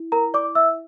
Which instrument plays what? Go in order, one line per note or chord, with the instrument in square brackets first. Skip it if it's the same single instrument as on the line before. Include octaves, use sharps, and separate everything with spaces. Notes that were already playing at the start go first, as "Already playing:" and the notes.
Already playing: [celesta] E4
A#4 A#5
D5 D6
E5 E6